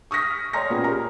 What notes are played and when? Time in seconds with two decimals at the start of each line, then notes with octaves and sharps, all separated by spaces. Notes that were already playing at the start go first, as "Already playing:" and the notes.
0.11 C#6 D#6 F6 A#6 B6
0.53 C#5 D5 G5 A#5 C6 A#6
0.70 A#2 B3 C#4 G#4
0.84 G4 A#4 A#5